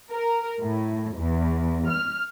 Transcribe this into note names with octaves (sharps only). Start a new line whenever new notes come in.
A#4
A2
E2
F6